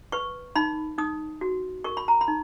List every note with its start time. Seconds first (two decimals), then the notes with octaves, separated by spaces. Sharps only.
0.12 B4 C#6
0.56 D#4 B5
0.98 D#4 D#6
1.41 F#4
1.84 A#4 C#6
1.97 B5
2.08 A#5
2.21 B5
2.28 D#4